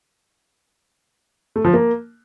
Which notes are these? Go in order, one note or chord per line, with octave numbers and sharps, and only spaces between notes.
A3
F3
A#3